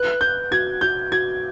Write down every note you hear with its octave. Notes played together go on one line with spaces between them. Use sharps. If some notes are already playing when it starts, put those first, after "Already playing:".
Already playing: B4 F#6
B4 G6
F#4 G#6
F#4 G6
F#4 G#6